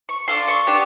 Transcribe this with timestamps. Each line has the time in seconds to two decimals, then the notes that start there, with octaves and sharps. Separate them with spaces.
0.09 C#6
0.28 D4 F4 A4 C6
0.48 C#6
0.67 B3 D4 G4